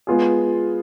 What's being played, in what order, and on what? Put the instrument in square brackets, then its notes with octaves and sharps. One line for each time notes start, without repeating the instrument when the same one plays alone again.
[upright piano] G#3 B3 F4 G#4